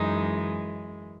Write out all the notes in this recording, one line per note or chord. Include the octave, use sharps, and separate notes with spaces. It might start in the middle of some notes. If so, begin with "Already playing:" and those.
Already playing: F#2 E3 G#3 D#4